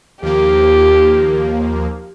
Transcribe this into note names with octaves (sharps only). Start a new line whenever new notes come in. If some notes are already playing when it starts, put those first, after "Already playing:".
D#2 F3 A#3 G4